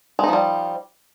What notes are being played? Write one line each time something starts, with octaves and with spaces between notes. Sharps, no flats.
F3 G3 G#3 D#4